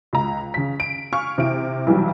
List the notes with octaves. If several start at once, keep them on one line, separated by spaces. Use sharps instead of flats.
C#2 A#5
C#3 B6
D7
F5 G#5 C#6 F6
C3 E4 D7
B1 E3 F#3 G3